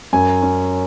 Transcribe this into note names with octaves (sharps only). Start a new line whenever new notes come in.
F#2 G#5
C#4